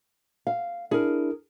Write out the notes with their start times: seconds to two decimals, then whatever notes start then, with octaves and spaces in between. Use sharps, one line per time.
0.47 F5
0.91 D4 E4 G#4 A#4